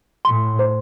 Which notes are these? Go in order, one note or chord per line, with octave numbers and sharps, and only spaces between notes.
A2 C6
C5